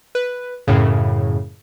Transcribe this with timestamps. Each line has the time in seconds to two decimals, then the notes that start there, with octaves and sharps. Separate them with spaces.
0.15 B4
0.68 F#2 A2 C#3